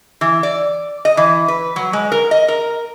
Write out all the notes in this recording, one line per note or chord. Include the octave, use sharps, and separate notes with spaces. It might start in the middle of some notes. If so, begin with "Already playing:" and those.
E3
D5
D#5
E3
B4
F#3
G#3
A#4
D#5
A#4